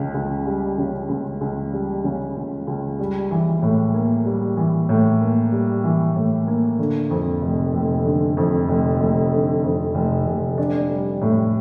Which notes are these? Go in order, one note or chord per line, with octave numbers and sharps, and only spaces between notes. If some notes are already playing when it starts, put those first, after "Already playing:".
Already playing: C#2 C#3
C#2
G3
C#3
C#2
C#2
G3
C#3
C#2
C#2
G3
E3
A2
A#3
G3
E3
A2
A#3
G3
E3
A2
A#3
D3
F2
F1
F1
D3
F2
F1
F1
D3
F2
F1
F1
D4
G3
A2